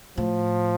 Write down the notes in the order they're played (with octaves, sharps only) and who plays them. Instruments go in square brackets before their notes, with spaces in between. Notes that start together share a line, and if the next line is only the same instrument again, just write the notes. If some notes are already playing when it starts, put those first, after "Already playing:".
[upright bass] A2 [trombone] F3